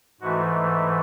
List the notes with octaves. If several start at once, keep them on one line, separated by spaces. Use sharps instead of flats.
G#2 E3 A3 F#4